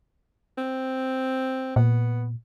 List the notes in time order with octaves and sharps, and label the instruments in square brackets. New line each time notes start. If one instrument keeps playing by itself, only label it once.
[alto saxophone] C4
[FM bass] A#2 [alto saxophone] B3